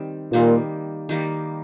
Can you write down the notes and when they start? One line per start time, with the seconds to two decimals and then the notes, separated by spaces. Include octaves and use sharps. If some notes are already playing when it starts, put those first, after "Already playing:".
Already playing: D#3 G3 C4
0.33 A#2 D#3 G3 A#3
1.09 D#3 G3 A#3